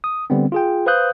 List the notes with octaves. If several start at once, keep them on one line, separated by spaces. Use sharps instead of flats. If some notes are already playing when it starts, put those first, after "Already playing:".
D#6
D3 G3 B3 C4
F4 G#4 G5
B4 C5 F5 D#6 F#6 G6